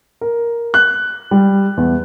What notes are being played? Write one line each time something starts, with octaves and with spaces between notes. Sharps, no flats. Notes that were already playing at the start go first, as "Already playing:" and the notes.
A#4
F#6
G3
E2